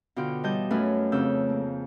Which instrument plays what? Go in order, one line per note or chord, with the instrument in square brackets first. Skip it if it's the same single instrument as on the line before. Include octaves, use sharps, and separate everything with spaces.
[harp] B2 D3 F4 G5 F6
E3 G3 D#5 A5 G6
F#2 A3 B4 G#5 F6
F2 C#3 E6 G6
A#3